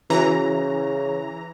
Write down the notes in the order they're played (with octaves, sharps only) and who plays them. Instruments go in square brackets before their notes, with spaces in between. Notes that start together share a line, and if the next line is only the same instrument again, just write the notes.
[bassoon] C#3 [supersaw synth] E3 A#5 [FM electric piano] C#4 F#4